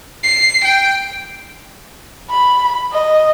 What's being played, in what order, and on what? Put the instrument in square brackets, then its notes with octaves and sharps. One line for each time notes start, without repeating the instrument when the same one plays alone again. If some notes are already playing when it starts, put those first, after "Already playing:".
[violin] C7
G5
[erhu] B5
D#5